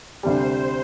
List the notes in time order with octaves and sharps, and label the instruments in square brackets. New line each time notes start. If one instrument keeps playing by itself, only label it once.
[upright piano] D2 C3 G3 [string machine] C5